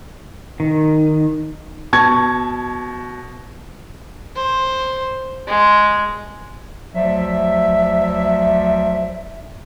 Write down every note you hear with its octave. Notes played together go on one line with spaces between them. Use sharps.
D#3
B2 A5 C#6 G#6
C5
G#3
D2 F3 F#3 D5 E5